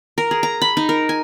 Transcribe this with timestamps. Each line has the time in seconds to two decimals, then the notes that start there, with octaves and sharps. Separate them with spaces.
0.18 A#4
0.31 G#4
0.43 A#5
0.62 B5
0.77 D#4
0.89 A#4
1.09 G#5